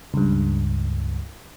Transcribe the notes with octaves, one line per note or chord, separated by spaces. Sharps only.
C#2 G2